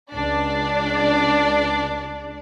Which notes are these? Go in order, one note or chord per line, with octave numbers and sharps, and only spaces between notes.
C#2 D4 D5